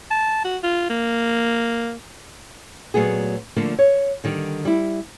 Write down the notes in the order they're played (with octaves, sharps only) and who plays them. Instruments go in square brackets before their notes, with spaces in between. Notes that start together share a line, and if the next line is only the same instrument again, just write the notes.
[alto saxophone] A5
F#4
F4
A#3
[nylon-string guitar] A#2 F#3 A3 B3 G#4
D3 F3 A3 A#3 D4
C#5
D3 D#3 G3
G3 E4